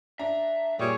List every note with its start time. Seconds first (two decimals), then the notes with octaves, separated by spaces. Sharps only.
0.19 D4 E5 A#5
0.79 A#2 G3 G#4 C#5